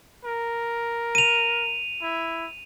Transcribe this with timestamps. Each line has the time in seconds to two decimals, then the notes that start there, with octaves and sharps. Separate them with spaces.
0.25 A#4
1.15 D#7 F7
2.02 E4